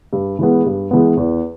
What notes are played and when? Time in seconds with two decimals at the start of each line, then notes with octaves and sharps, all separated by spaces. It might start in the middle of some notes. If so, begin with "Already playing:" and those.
0.13 G2
0.39 E3 G#3 B3
0.66 G2
0.91 E3 G#3 B3
1.17 E2